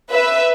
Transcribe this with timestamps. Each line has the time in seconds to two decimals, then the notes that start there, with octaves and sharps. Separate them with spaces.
0.11 B4 E5